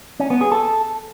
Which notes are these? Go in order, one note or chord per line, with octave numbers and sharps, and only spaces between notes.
C#4
B3
G#4
A4